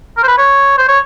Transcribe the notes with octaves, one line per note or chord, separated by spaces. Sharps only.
A#4
C5
B4
C#5
C5
C#5